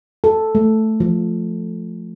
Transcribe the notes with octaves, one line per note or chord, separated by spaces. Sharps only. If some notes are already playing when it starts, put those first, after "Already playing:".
A4
A3
F3